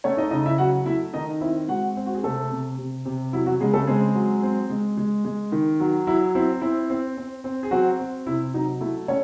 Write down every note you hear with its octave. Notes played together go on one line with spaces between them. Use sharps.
A3 C#4 C#5
D#4 D#5
C#3 D#4 D#5
E4 E5
F#3 F#4 F#5
A3 E4 E5
D#3 D#4 D#5
C4 E4 E5
G#3 F#4 F#5
C4
F#4
G#4
C3 A3 A4
C3
C3
C3
F#3 E4
F#3 F#4
C#3 G#3 G#4
A3 A4
G#3 C4 G#4
F#3
C4
G#3
G#3
G#3
D#3
F#3
F#3 E4
C4 E4
C4 E4
C4
C4
C4
G#4
F#3 C4 F#4
C4
C3 E4
F#3 D#4
A3 E4
A3 C#4 C#5